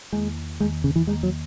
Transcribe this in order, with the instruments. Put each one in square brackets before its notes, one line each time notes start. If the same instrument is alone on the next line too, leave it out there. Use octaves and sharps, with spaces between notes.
[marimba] E2 D#3 A#3 [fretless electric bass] G#3
[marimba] E2 D#3 A#3 [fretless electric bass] G#3
[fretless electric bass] C#3
E3
[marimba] E2 D#3 A#3 [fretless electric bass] G#3
[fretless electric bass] F#3